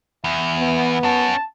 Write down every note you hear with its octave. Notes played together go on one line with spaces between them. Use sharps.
E2 E5
B3
C#4 F#4 A5